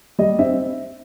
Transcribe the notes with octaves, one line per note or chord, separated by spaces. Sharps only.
G3 D#5
C4 E5